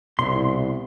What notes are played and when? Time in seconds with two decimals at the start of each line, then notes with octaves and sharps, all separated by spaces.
0.19 C2 B2 E4 C6